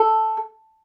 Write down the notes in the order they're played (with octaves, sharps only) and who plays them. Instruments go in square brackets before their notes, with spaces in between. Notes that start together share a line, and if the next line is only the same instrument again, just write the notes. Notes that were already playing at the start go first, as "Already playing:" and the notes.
Already playing: [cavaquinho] A4